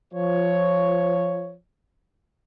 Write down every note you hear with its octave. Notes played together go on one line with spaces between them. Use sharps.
F3 C#5